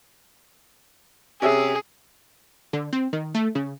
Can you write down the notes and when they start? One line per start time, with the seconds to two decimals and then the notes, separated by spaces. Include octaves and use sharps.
1.42 C3 C#4 G#4 E5
2.73 D3
2.93 C4
3.13 D#3
3.35 A3
3.55 C#3